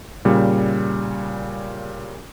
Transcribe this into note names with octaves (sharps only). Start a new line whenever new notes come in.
A#2 C#3 G3